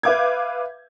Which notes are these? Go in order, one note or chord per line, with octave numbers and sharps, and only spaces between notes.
B4 E5 F5 D6 G6 G#6